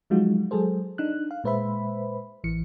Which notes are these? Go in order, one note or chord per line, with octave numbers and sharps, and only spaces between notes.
F3 F#3 G#3 D#4 F4 F#4
F#3 G#3 G#4 A4 C5
D4 D#4 F#6
F5
A#2 G#3 B4 C5 E5 B5
A1 E3 C#7